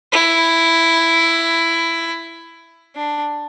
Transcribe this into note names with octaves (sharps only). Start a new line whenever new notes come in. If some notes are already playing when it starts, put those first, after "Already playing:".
E4
D4